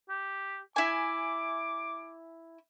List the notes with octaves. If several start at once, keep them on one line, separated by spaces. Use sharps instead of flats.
G4
E4 G#5 D6